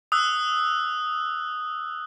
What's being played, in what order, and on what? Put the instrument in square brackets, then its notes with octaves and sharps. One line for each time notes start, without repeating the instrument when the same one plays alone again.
[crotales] D#6 E6 F#6